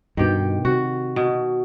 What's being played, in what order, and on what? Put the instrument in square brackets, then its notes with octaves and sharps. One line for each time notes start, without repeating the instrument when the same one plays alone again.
[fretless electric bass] G2 B2 [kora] D#3 G4
[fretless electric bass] C3 [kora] F#4
[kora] B2